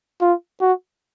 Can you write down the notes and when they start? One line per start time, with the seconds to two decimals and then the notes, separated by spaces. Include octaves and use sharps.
0.21 F4
0.60 F#4